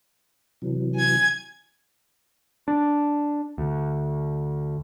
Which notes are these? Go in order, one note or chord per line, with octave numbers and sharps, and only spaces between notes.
C3 E3 F#3
G#5 G#6
D4
D2